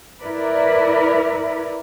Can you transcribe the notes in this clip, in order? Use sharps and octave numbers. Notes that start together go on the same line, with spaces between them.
E4 A#4 B4 D5